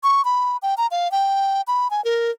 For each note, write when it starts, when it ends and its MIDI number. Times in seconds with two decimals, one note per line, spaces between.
0.03 0.24 85
0.25 0.57 83
0.62 0.74 79
0.78 0.87 82
0.91 1.11 77
1.12 1.61 79
1.67 1.90 83
1.91 2.03 80
2.05 2.31 70